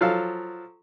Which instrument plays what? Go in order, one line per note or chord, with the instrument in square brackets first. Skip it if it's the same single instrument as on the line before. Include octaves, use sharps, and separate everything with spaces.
[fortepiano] F3 F#3 A4 F5